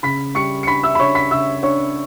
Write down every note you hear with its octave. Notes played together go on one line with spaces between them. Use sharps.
C#3 B5 B6
G3 C#6 C#7
C#7
D4 B5 B6
E5 E6
B5
C#3 C#5 C#6
B5 B6
C#3 E5 E6
D4 C#5 C#6